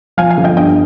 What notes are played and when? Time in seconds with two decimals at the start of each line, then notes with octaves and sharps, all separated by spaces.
0.17 F3 F5 G#5
0.31 F5 G#5
0.38 G1
0.44 D#5 G5
0.57 G2 D#5 G5